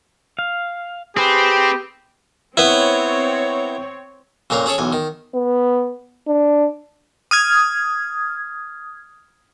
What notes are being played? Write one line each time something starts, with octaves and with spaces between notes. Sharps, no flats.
F5
C4 G4 G#4 B4
B3 C4 E4 C#5
F2 A#2 C#4 A#5 C6
C#4 G#4 A4 C#5
B1 E2 G#5
D#3
B3
D4
D#6 F6 G#6